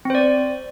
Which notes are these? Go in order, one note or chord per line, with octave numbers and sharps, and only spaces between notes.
C4 C5 D5